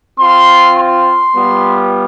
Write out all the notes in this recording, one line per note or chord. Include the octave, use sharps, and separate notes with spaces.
C4 F4 C6
C6
G3 B3 F4